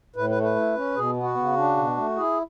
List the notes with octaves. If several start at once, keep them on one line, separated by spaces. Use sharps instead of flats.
A2 B4
B4
A3
B4
E4
C#4
B2 G#4
B3
F#4
C#3
D4
B2
A3
E4 G#4